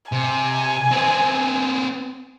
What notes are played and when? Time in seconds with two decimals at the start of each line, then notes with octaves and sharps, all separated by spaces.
0.12 C3 G#5
0.92 B3 C4